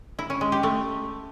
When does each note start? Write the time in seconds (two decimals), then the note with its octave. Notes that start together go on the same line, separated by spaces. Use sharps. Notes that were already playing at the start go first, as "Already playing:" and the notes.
0.19 E4
0.30 C#4
0.41 G#3
0.52 G4
0.63 A3